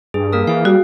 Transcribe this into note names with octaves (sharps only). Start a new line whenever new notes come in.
G2 G#4
A#3 A#4 D#6
E3 G#4 F5
G3 F#4